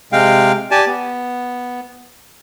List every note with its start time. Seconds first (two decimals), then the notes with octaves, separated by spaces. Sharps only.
0.12 C3 G#3 F5 G5
0.71 G4 D5 G#5 A5
0.86 B3